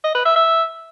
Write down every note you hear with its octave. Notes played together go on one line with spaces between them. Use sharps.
D#5
B4
E5
E5